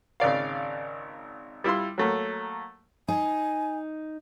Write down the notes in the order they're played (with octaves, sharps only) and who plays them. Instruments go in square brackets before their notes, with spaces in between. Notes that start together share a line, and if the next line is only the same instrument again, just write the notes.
[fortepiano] G#1 C#3 D5 F5
G3 E4 F4 C6
F#3 A3 A#3
[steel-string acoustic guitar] D#4 [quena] G#5